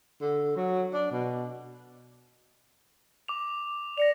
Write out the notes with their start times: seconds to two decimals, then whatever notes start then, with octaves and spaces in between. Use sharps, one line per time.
0.21 D3
0.56 F#3
0.93 D4
1.12 B2
3.28 D6 F7
3.98 D5 A#6 C#7 F7